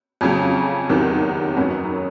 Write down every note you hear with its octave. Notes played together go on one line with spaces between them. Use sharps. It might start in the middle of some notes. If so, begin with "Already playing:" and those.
F2 C#3 F#3 C#4
E2 C3 D#3 F#3
F#2 D#3 F#3 B3